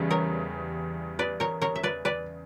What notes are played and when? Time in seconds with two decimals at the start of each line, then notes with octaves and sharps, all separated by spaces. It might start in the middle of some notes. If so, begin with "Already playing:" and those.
Already playing: E2 C#3 G3
0.10 A#4 C#5
1.19 B4 D5
1.40 A#4 C#5
1.62 A#4 C#5
1.76 E5
1.83 B4 D5
2.05 B4 D5